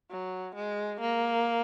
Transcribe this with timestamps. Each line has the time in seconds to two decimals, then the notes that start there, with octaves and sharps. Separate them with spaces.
0.11 F#3
0.55 G#3
1.01 A#3